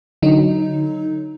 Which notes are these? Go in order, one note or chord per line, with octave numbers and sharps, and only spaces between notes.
D3 F#3 D#4